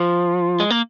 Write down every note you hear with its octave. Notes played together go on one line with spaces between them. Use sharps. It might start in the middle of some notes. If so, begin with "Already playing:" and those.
Already playing: F3
G#3
A#3